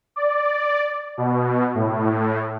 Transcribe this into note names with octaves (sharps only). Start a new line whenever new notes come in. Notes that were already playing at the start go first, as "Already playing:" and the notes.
D5
B2
A2